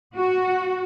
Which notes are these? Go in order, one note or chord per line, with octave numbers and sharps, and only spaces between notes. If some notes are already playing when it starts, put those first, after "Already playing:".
F#4